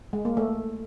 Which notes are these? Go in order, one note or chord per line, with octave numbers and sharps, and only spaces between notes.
G#3
A#3
A3